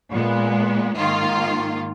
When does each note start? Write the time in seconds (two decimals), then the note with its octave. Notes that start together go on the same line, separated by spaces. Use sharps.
0.12 A#2 G#3 B3
0.96 G#2 D#3 A#3 F4